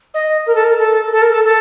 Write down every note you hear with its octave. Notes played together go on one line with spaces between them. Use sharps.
D#5
A#4
A4
A#4
A4
A4
A#4
A4
A4